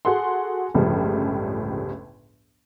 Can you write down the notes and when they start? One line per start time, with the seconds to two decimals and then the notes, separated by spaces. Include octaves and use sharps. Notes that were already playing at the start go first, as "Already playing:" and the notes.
0.05 F#4 G#4 A4 F#5 C6
0.74 G1 C#2 A2 C#3 F3 G3